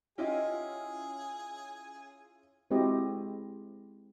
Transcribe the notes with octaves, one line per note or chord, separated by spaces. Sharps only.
C#4 E4 F4 G4 G#4 D#5 G#5
G#3 C4 E4 F#4 G4 D#5